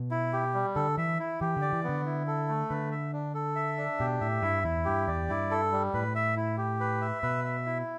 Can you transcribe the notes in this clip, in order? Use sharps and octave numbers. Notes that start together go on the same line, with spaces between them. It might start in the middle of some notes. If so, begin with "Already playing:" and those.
Already playing: B2
E4
G4
G3
D3 A4
E3 E5
E4
E3 G4
D3 D5
E3
B3
D3
E4
A4
A3
D3 B4
E5
D4
A4
E5
D4
B2 G4
A2 E5
G2 E4
E2 E4
G2 G4
E2 D5
G2 E4
A4
G3
A2 B4
E5
E4
G4
B4
E5
B2 B4
E5
E4